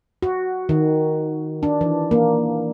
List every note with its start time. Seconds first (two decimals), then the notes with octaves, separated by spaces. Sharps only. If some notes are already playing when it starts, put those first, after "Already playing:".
0.22 F#4
0.69 D#3
1.63 D4
1.81 E3
2.11 A#3